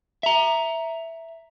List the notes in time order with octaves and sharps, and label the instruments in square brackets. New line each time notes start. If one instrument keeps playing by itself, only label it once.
[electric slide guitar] E5 A#5